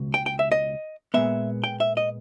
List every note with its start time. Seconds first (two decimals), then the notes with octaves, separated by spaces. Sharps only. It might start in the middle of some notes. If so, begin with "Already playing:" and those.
Already playing: C#2 B2
0.14 G5
0.26 G5
0.39 E5
0.52 D#5
1.14 A#2 G#3 B3 E5
1.64 G5
1.80 E5
1.97 D#5